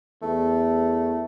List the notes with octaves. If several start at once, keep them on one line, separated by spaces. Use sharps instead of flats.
E2 A3